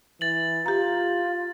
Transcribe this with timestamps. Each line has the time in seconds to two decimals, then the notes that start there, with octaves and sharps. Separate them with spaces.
0.21 E3 A6 F#7
0.66 F4 G4 A#5